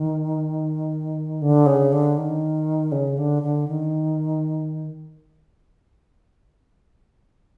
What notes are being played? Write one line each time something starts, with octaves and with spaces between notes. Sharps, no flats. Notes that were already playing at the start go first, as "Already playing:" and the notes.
Already playing: D#3
D3
C#3
D3
D#3
C#3
D3
D3
D#3